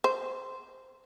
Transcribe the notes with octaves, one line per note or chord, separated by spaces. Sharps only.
C5